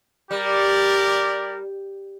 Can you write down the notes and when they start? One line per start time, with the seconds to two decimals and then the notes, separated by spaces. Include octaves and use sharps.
0.31 G3 G4 A#4 D5